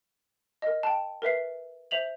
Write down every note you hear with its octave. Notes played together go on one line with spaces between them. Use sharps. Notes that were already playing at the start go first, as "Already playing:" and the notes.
A#4 D#5
G5 A5
A#4 B4 E5 C7
C5 E5 F7 F#7